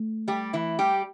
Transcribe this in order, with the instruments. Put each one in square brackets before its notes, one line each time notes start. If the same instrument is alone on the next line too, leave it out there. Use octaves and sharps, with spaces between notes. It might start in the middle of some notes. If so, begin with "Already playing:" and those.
Already playing: [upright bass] A3
[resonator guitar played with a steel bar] G3 G4
E3 E4
G3 G4